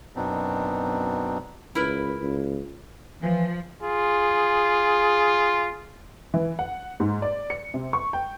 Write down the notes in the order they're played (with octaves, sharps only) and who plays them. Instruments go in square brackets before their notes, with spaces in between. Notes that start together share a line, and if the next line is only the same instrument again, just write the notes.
[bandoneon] F#2 B2 B3 C4 D4 D#4
[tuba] C#2 [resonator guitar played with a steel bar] E4 A#4 B4
[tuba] C#2
[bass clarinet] E3 [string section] F3
[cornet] F4 [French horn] G#4
[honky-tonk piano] E3
F#5
G#2
D5
C#7
C3
C#6
G5